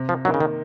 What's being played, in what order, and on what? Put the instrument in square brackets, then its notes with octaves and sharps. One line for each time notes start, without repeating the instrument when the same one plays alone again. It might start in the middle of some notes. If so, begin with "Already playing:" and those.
Already playing: [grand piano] C3
[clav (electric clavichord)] F3
[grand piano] D#3 A#3 D#4 [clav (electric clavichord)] F#3
[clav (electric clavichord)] C#3
D#3